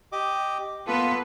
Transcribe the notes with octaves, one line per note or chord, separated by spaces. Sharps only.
G4 D#5 D6
A#3 B3 F4 A4 B4